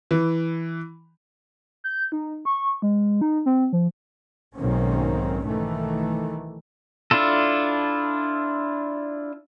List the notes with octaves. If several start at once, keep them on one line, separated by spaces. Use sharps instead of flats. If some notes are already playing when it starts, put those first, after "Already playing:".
E3
G6
D#4
C#6
G#3
D#4
C4
F3
B1 G#2 D#3 A#3 C4 C#4
B1 D#3 E3 A3
D4 E4 F4 A4